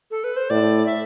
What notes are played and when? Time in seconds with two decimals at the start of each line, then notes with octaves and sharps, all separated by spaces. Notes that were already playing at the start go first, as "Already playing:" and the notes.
0.11 A4
0.24 B4
0.36 C5
0.50 A2 D5
0.86 E5